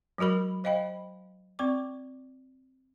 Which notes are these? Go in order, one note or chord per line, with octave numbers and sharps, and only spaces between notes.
F#3 G#3 F#4 A#4 B5
C5 D#5 F5 G5 B5
C4 D5 C#6 D6